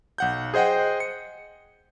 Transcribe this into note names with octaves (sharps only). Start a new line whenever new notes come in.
B1 F#5 G6
G#4 C5 D#5 F#5 G5
C#7